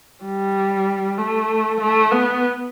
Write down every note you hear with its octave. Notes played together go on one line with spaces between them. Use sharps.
G3
A3
A3
B3